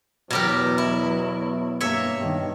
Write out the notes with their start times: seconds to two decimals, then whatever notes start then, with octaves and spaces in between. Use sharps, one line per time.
0.31 E2 B2 F#3 G4 A#4
0.78 E4
1.81 G2 A#3 C#5 E5
2.17 G2 D#3